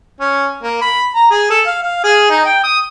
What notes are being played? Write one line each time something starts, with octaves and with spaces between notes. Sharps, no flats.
C#4
A#3
B5
A#5
G#4
A4
F5
F5
G#4
D#4
G5
D#6